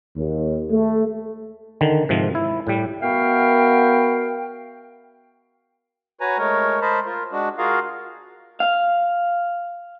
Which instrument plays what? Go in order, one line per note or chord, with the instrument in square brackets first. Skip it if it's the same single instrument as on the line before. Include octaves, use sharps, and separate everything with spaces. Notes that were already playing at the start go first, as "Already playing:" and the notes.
[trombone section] D#2
A3
[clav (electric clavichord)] D3 D#3
G#2 C3 F3
E4
A2 G3
[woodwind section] B3 F#4 A#4 E5 F5 G5
[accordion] F#4 B4 C#5 G#5 A#5
G#3 A3 A#4 C#5
A#4 C5 D#5 A5 B5
F4 A#4
G#3 D4 F#4
F4 F#4 G#4 A#4 F5
[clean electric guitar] F5